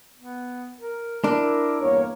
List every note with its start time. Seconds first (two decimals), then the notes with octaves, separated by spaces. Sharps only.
0.17 B3
0.80 A#4
1.24 D4 E4 A#4
1.81 E2 G2 A#3 C#5